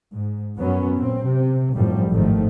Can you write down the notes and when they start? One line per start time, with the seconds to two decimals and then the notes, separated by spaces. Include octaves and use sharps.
0.12 G#2
0.57 F#2 F#3 B3 C#4
0.96 A#2 C4
1.25 C3
1.75 G#1 F#2 A2 F3 G3
2.10 G#1 A2 D#3 F3 A3